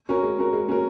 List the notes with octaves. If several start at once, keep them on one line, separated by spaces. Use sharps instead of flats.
C#4 F#4 A#4
G#3
C#4 F#4 A#4
G#3
C#4 F#4 A#4